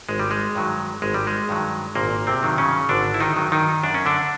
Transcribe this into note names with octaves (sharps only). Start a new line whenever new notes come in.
G#1 G#3
G3
G#3
G2 D#3 F#3
G#1 G#3
G3
G#3
G2 D#3 F#3
G#1 A#2 A#3
C3 C4
G2 D#3 F#3
C#3 C#4
G#1 D3 D4
E4
D#3 D#4
G2 D#3 F#3
D#3 D#4
F#2 D4
C#4
D3 D4